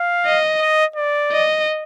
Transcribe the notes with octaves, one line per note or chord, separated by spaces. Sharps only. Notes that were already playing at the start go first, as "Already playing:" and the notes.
Already playing: F5
D#5
D#5
D5
D#5